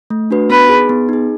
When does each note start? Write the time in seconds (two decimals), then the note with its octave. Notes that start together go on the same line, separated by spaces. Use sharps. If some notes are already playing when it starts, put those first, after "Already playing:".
0.10 A3
0.31 D4 F#4 B4
0.50 B3 B4
0.69 D#4 G#4
0.89 B3
1.09 D#4 G#4